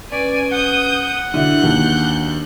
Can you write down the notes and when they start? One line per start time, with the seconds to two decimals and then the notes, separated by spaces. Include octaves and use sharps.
0.12 C#4 B4 D5 G#5
0.52 F#5 D#6 G6
1.34 D3 D4 E4 F#4 F#6 G6
1.63 D#2